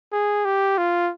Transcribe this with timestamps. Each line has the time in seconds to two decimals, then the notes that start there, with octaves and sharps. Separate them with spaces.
0.12 G#4
0.45 G4
0.78 F4